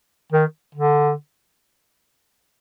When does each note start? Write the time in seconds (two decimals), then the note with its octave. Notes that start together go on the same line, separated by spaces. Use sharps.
0.32 D#3
0.75 D3